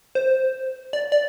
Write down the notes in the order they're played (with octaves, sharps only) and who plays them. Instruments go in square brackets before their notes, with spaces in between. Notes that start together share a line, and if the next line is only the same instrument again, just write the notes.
[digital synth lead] C5
D5
D5